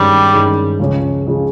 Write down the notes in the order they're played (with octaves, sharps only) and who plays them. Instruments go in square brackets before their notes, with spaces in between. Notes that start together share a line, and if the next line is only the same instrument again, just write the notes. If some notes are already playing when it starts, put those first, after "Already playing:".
Already playing: [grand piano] G2 D#3 G#3 C#4 [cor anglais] G3
[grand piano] G2 D#3 G#3 C#4
C#2 C#3 F3 G#3 C#4
C#3 F3 G#3 C#4